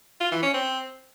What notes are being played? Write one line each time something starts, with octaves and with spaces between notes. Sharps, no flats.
F4
E3
C#4
C4